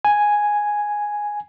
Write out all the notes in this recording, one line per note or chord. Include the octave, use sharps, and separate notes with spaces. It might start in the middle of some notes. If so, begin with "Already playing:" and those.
G#5